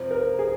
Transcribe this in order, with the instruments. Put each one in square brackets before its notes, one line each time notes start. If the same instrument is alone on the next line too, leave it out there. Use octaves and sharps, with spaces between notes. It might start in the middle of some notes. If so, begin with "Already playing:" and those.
Already playing: [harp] F2 C3 F3 C4
[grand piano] A#4
G#4